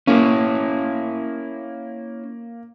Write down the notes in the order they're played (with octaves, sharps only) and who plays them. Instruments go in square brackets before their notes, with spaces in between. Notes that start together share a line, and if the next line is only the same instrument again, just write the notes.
[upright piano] A#3 [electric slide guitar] C#4 E4